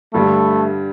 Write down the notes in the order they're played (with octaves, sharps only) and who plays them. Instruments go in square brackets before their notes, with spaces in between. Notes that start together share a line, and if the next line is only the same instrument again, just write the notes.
[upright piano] G2 D3 G3 [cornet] A3